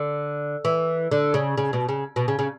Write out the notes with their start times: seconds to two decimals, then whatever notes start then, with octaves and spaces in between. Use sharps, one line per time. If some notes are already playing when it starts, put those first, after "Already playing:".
Already playing: D3
0.65 E3
1.12 D3
1.34 C#3
1.58 C#3
1.73 B2
1.89 C#3
2.16 B2
2.28 C#3
2.39 C#3